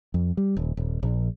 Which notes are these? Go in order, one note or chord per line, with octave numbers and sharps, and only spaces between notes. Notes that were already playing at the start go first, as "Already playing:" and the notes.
F2
G3
D#1
D#1
A#1